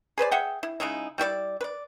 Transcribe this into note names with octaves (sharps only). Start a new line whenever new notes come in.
G#4 B4 C5 D5
G#4 E5 F#5 G5
E4
C#3 G#3 D#4 E4
G3 E4 F#4 D5
B4 D5